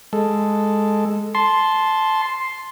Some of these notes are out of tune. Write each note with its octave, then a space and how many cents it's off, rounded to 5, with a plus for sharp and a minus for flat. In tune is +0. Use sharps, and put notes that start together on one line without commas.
G#3 +0 A4 +0
A5 -10 C6 +0